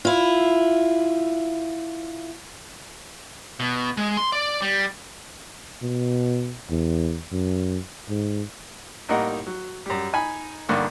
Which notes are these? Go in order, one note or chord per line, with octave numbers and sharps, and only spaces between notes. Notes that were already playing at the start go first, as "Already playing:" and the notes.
E4 F4
B2
G#3
C6
D5
G3
B2
E2
F#2
G#2
A1 G3 A#3 D#4 D#5 F#5
F#3
F#2 G3
D#4 G#5 B5
B1 G2 D3 A#3 C#6